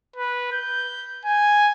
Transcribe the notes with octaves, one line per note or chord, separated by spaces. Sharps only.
B4
G6
G#5